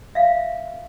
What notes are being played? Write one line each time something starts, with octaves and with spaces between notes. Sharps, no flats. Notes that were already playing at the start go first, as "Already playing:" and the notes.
E5 F5